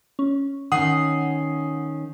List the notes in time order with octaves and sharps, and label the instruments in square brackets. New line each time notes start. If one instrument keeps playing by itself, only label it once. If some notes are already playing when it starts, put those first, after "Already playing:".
[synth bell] C#4
[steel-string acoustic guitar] D#3 C#4 [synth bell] F#5 C7 [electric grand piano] D#6